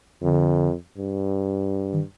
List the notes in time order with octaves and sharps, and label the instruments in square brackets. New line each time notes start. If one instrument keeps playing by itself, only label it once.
[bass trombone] F2 [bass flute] D3
[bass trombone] G2
[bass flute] D#3